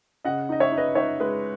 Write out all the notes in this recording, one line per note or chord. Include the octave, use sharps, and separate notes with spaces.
C#3 D#5 F#5
D#4 D#5
C#5 E5
D#4
B4 D#5
D#4 C#5 E5
G#3 B4